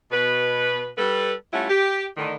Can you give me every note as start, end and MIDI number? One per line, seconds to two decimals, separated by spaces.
0.11 0.89 47
0.11 0.89 71
0.98 1.32 55
0.98 1.32 69
0.98 1.32 71
1.53 1.66 55
1.53 1.66 57
1.53 1.66 61
1.53 1.66 64
1.53 1.66 65
1.53 1.66 78
1.70 2.05 67
2.17 2.34 45
2.17 2.34 50
2.17 2.34 51